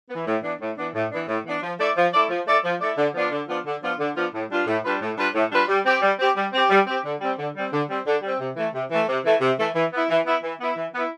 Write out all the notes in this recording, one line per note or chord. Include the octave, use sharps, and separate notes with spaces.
B3
E3
A2
E3 B3 D4
A2
E3 B3 D4
A2
E3 B3 D4
A2
E3 B3 D4
F3
A3 E4 A4 D5
F3
A3 E4 A4 D5
F3
A3 E4 A4 D5
F3
A3 E4 A4 D5
D3
F3 B3 D4 F4
D3
F3 B3 D4 F4
D3
F3 B3 D4 F4
D3
F3 B3 D4 F4
A2
G3 D4 F4 B4
A2
G3 D4 F4 B4
A2
G3 D4 F4 B4
A2
G3 D4 F4 B4
G3
C4 G4
G3
C4 G4
G3
C4 G4
G3
C4 G4
D3
G3 C4
D3
G3 C4
D3
G3 C4
D3
G3 C4
C3
E3 A3
C3
E3 A3
C3
E3 A3
C3
E3 A3
E3
B3 E4
E3
B3 E4
E3
B3 E4
E3
B3 E4